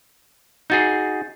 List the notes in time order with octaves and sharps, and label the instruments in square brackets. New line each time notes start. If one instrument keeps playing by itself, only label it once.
[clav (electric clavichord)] D#4 F#4 G#4 [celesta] G6 A6 C7